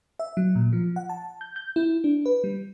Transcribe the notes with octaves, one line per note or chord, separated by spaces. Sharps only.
E5
F#3
A#2
F3
F#5
A5
G6
G6
E4
D4
B4
G3